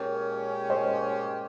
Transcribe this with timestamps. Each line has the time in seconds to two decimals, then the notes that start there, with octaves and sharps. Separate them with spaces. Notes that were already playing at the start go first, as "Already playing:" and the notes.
Already playing: A#2 G#3 C#4 G4 A#4 C#5
0.70 C5 D#5